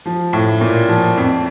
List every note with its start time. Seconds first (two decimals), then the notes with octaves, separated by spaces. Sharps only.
0.06 F3
0.33 A2
0.61 A#2
0.88 F3
1.17 F2